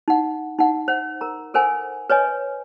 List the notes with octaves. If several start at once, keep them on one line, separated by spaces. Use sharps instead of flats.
D#4 F#5
D#4 F#5
C5 F#5
A#4 A#5
A4 A#4 C5 F#5 G#5
B4 C#5 D#5 G#5